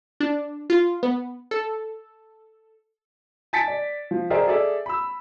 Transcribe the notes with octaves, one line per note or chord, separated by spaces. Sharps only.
D4
F4
B3
A4
G#5 A5 A6 B6 C#7 D7
D5
F3
G4 G#4 A#4 C5 D5 E5
G#4 A4 D5 E5
B5 E6